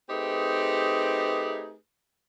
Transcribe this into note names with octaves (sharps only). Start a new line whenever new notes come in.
A3 C4 D#4 G4 G#4 B4